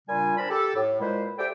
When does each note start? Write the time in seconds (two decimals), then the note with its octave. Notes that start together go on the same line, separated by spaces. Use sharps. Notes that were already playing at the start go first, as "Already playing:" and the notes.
0.08 A#2 C#3 G3 D4 F4 G#5
0.37 C4 D4 A#4 D5 A5 B5
0.50 G4 A4
0.75 A2
1.00 A#2 G#3 E4 B4 C5
1.38 G4 A4 C5 D5 E5 G5